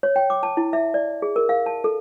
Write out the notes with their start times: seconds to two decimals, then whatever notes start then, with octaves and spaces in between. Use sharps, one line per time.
0.03 C#5
0.16 G5
0.30 D6
0.43 A5
0.57 E4
0.73 E5
0.94 D5
1.22 G#4
1.36 A#4
1.49 F5
1.66 A5
1.84 A4